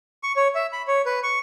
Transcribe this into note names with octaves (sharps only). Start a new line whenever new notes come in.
C#6
C#5
E5
B5
C#5
B4
C#6